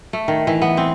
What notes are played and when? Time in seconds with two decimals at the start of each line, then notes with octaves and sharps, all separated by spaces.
0.13 A3
0.28 D#3
0.47 E3
0.62 B3
0.77 C4